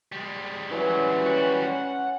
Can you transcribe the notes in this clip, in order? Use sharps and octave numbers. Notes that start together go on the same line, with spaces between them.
G3 G#3
E3 F#3 C#4
F#4
F#5